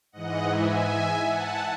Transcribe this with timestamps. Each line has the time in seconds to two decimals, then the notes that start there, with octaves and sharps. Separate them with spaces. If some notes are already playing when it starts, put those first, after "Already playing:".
0.12 G#2 E3 D#5 F#5
0.50 E5 G#5
1.26 F#5 A5